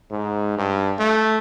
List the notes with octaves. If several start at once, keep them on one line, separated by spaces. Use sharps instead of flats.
G#2
G2
A3